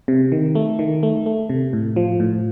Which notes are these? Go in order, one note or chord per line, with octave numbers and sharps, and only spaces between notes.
C3
D#3
A3
D#3
A3
A3
C3
A2
F3
A2